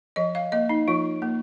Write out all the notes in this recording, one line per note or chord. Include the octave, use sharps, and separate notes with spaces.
F3 D#5
F5
A#3 D#5
D#4
F3 F4
A#3